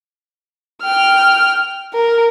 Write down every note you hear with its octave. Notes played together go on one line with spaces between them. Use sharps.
G5 F6
A#4